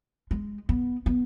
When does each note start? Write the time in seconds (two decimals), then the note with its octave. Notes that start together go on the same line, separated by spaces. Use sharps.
0.31 G#3
0.69 B3
1.06 B3